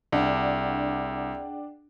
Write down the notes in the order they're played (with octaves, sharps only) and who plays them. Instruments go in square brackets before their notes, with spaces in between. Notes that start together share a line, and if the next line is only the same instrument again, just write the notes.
[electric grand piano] C2 [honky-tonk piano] D4 [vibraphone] G#4 F#5 G5